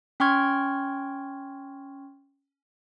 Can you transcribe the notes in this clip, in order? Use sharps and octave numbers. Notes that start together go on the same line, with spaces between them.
C#4 G5 C6 C#6 F6 G#6